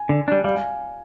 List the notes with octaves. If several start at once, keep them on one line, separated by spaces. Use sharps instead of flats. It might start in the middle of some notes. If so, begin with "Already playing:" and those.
Already playing: G#5
D3
G3 D4
G3 F5
G#5